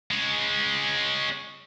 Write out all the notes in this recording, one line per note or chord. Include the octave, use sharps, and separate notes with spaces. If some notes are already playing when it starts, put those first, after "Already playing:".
G#3 C#4